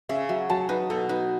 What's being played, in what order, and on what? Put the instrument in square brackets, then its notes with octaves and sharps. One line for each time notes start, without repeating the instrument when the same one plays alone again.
[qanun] C#3 [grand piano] E5
[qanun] F#3 [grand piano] E5
[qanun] F#3 [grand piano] A5
[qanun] D#4 [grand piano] B4
[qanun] B2 [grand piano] A4
[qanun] D#4 [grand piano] B4